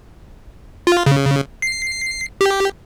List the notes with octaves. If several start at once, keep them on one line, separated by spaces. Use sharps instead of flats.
F4
C#3
C7
G4